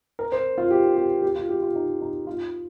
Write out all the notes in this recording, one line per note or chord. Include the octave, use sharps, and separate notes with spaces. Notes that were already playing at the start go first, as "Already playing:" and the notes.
A#4
C5
F4
G4
G4
G4
F4
G4
F4
D#4
D#4
F4